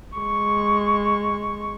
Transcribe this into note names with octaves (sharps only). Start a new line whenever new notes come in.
G#3 C#6